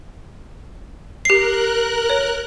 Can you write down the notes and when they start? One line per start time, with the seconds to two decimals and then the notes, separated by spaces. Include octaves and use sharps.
1.25 G4 A#4 F#6 C7
2.10 C#5